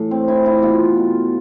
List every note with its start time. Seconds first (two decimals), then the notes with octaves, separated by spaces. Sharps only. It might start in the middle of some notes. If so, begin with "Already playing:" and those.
Already playing: A2 E3 A3
0.11 C4
0.28 E3 E4
0.46 E4
0.62 B2 F4
0.97 B2